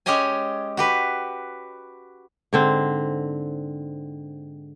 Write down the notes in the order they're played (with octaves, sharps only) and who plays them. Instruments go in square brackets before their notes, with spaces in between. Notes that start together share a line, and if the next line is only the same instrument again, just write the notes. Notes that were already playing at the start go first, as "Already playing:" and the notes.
[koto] G#3 C#4 G4 C#5 D#5 G#5
F#4 G4 B4
[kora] G#2 D3 C4